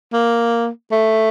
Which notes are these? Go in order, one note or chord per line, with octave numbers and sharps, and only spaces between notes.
A#3
A3